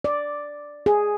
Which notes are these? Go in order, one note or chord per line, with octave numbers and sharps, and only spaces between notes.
D5
G#4